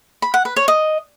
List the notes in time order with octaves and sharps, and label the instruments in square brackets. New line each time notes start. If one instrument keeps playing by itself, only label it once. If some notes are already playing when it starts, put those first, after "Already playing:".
[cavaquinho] B5
F#5
B4
C#5
D#5